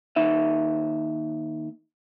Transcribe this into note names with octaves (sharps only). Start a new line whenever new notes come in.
D#2 D#4 E5